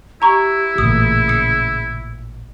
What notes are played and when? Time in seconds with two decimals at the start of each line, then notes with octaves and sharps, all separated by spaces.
0.22 E4 G4 A#5 C#6
0.78 A1 A#2 C#3 D#6
1.28 D#6 C#7